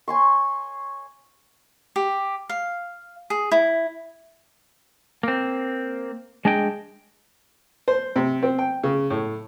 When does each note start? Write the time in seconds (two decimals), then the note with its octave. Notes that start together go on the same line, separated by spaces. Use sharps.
0.08 C#5 G#5 C6 C#6
1.96 G4
2.49 F5
3.30 G#4
3.51 E4
5.23 A#3 C4
6.45 G#3 D4 G#4 D#5 G5
7.88 C5
8.16 C3
8.43 C4
8.59 G5
8.84 C#3
9.10 A2